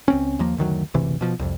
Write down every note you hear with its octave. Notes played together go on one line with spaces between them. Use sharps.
C#2 C4 C#4
D#2 F3 A#3
F#1 D2 D#3 F#3
F#1 D2 C3 E3
B2 F3
C2 F2